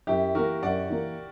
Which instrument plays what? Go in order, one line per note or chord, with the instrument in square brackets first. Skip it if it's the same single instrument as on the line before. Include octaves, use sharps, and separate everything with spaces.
[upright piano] F#2 [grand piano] E4 G4
[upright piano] E3 A#3 [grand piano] F#4 A#4
[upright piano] F#2 [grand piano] D5 F#5
[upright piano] E3 A#3